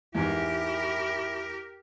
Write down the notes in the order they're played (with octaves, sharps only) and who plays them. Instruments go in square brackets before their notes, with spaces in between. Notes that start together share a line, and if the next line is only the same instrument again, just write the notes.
[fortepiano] E2 G#2 [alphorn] E4 [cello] G4 A#4